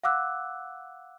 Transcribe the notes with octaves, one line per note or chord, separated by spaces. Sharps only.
F5 F#5 D6 E6 F#6